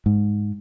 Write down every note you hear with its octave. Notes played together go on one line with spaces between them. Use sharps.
G#2